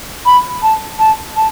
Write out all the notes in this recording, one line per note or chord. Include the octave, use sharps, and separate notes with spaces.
B5
A5
A5
A5